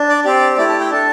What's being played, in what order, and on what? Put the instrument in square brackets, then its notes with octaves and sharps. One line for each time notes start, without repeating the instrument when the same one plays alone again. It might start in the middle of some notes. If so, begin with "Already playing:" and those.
Already playing: [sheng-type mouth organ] D4
D5
C4 G4 D5
A3 E4 G4 D5
A5
G5
D4 A4 A5